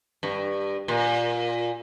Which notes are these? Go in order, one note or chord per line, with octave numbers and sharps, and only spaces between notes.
G2
A#2